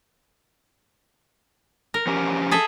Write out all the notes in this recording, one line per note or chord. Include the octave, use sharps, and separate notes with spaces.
A#4
F3 C#4 G4
G#4 A4 E5